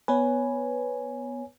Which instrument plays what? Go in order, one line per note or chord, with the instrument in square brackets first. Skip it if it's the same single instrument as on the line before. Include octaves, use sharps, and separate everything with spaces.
[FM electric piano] B3 B4 [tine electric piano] C#5 G#5